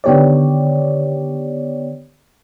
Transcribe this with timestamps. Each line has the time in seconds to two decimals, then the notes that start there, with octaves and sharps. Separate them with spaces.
0.04 D3 D#3 B3 G4 C#5 D5